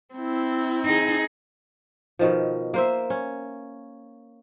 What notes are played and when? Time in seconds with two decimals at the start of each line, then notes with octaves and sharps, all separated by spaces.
0.15 C4 E4
0.85 D#4 G#4
2.19 B2 D#3 F3
2.74 A#3 C5 E5
3.10 C#4